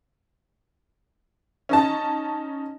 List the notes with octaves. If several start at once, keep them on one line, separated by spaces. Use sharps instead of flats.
C#4 D#4 A5